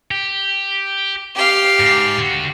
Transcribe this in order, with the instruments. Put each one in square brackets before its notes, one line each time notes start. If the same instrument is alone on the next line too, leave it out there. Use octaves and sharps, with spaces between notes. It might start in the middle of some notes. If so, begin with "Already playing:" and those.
[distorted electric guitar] G4
[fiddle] G4 F5
[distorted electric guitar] G#2
D3 F#4